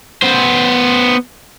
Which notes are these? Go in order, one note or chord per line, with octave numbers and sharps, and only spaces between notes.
B3 C5